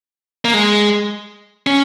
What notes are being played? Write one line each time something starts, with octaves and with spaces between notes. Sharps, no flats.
A#3
G#3
C#4